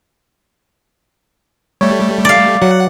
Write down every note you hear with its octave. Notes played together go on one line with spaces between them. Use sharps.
G3 A3 C#5
D5 F5
F#3 F#5